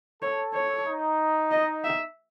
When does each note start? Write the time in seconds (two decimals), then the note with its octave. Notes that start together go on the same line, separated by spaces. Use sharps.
0.22 A4 C#5
0.54 C#5
0.86 D#4
1.51 D#5
1.84 E5